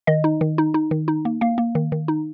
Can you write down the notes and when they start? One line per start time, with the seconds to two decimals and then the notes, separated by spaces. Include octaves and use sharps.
0.07 D#3 D#5
0.24 D#4
0.41 D#3
0.58 D#4
0.74 D#4
0.91 D#3
1.08 D#4
1.25 A#3
1.41 A#3 F5
1.58 A#3
1.75 D#3
1.92 D#3
2.08 D#4